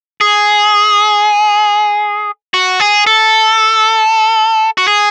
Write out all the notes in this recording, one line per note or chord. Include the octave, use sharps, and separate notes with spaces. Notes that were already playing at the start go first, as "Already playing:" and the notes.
G#4
F#4
G#4
A4
F#4
G#4